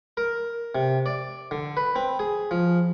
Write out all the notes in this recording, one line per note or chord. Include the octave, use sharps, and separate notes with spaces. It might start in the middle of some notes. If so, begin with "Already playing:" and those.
A#4
C3
D5
D3
B4
C4
G#4
F3